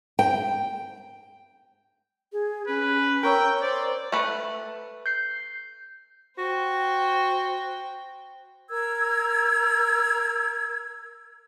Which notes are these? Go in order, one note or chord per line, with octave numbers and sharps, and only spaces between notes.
G5
G#4
C#4 B4
A#4 C#5 G5 E6
C5 D5
A3 B4
G6 C7
F#4 C5 G5
A#4 E6 G#6